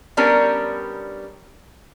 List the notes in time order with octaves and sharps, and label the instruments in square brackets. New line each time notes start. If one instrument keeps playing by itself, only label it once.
[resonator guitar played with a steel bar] G3 B3 C#4 D4 A#4